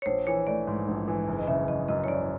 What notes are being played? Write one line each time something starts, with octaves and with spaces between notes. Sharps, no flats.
C#5
A#1 C5
E3 C#5
A3 D5
G#2
A#1
E3
F#1
D#5
C#3 E5
F#1 D#5
F#2 D#5
C#5
F#1 D5